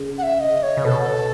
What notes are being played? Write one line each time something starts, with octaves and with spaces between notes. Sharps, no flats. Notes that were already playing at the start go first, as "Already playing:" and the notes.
Already playing: C#3
F#5
E5
D#5
C#5
C#3
B2 A4